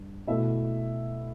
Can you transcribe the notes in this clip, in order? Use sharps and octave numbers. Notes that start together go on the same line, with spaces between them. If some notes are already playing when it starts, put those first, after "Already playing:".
Already playing: G2
B2 A3 E4 E5